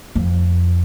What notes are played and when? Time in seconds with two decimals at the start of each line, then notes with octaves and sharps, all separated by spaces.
0.15 F2